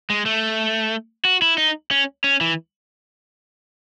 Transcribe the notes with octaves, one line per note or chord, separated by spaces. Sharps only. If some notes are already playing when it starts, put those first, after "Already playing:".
G#3
A3
F#4
E4
D#4
C#4
C#4
E3